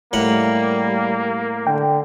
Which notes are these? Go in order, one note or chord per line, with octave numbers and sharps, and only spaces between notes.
A2 G3 A#3 F#5
D3 G5